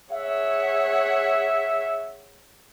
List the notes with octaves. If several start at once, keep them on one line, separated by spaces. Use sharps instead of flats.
G#4 C#5 E5 F#5